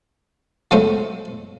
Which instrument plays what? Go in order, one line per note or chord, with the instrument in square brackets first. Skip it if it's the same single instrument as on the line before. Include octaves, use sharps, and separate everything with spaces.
[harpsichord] C#3 F#3 G#3 A3 C#4 C5